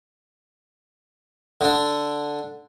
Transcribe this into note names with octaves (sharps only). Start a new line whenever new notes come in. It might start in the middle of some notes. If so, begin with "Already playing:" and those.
D3 D4